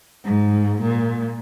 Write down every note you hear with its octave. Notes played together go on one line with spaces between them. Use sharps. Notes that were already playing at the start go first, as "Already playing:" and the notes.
G#2
A#2